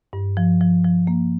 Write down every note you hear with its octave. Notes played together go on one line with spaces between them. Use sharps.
G2
F3
F3
F3
A#3